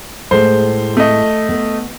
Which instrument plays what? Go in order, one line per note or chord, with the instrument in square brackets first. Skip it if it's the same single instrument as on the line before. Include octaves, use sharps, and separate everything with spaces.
[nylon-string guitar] A2 G#3 [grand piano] C5
[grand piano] A3 D#5
[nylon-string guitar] B3